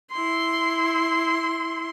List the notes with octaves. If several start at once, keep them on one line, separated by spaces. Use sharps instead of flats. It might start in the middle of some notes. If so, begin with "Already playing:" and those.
E4 C6